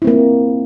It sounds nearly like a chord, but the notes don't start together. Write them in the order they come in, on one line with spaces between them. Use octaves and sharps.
E4 C4 A#3